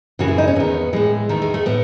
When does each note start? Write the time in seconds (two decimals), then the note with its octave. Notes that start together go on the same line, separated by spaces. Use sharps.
0.19 F#2 C#3 E3 F#4
0.28 E4
0.38 D#4
0.48 C#4
0.56 E2 D#3 B3
0.93 A2 E3 G#3
1.29 E2 D#3 A3
1.42 G#3
1.54 A3
1.66 A2 B3